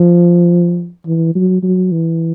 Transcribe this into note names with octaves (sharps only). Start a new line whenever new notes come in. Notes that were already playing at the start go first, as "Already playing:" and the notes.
Already playing: F3
E3
F#3
F#3
E3